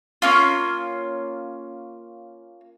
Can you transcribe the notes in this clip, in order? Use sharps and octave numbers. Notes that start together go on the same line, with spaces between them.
A#3 C#4 F4